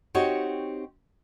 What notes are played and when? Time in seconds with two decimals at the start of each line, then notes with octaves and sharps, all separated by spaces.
0.14 C4 D#4 F#4 G4 C#5